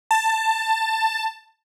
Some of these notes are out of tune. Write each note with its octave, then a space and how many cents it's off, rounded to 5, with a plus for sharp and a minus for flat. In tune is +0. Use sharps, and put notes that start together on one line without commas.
A5 +15